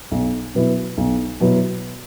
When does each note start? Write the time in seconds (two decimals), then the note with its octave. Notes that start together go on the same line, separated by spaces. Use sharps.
0.11 B1
0.55 B2 F#3 B3 E4
0.97 B1
1.40 B2 F#3 B3 E4